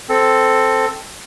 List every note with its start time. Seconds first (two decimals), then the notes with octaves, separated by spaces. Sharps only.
0.09 C4 A4